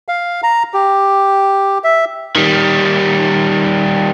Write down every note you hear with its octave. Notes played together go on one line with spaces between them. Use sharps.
F5
A#5
G4
E5
D#3 G3